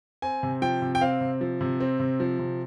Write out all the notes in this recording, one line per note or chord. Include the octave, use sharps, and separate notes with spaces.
C4 G#5
C3
F3 G5
C3
G5
C4 F5
C3
F3
C3
C4
C3
F3
C3